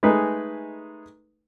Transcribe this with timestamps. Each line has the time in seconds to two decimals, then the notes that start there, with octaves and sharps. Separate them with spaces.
0.03 G#3 A3 D#4 G#4 B4